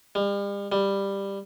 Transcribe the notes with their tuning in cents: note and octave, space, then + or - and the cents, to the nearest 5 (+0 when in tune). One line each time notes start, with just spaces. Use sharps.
G3 +40
G3 +10